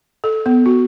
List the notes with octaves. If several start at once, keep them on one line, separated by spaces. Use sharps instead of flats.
A4
B3
F#4